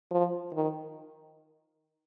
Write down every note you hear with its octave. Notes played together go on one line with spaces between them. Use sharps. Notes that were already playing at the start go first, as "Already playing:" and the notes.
F3
D#3